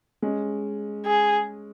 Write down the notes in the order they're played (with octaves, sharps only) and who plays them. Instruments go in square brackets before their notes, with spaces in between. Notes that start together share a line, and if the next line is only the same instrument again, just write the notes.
[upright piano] G#3 C#4
[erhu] G#4